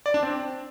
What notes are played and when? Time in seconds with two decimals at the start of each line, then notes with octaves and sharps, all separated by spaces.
0.06 D5
0.14 D4
0.23 C4